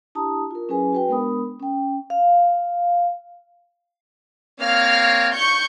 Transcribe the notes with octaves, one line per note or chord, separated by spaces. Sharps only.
D4 E4 G4 A5 A#5 D#6
F4 A#4
F#3 C#4 E4 G#4 B4 G#5
F#4 B4 G5
G#3 B3 D4 A#4 B5 D#6
C#4 G5
F5
A#3 C4 C#5 F5 F6
C#6 G6